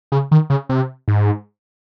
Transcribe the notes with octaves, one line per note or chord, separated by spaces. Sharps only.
C#3
D#3
C#3
C3
G#2